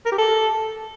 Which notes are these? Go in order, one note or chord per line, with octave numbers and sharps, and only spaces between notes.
A#4
G4
A4